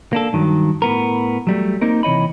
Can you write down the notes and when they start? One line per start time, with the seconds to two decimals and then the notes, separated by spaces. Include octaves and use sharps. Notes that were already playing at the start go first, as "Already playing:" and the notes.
0.13 A#3 D4 A4
0.33 G2 D#3 F#3
0.82 A2 B3 A#4
1.47 F#3 G3 A3
1.81 A#3 C4 D#4 A#4
2.03 C3 E3 C#5 D#5 B5